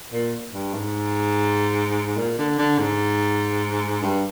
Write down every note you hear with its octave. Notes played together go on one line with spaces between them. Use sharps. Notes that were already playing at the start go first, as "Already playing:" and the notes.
A#2
G2
G#2
A#2
D3
D3
G#2
G2